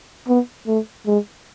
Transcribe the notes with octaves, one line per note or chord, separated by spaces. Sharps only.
B3
A3
G#3